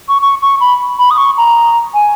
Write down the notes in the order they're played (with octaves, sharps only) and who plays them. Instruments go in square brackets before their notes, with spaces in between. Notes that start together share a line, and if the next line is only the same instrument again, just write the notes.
[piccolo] C#6
C#6
C#6
B5
B5
D#6
C#6
A#5
G#5